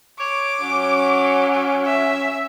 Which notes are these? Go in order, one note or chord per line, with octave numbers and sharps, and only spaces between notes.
C#5 D6
F#3 C#4
E5